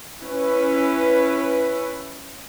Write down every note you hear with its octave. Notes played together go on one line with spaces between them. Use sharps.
C#4 E4 B4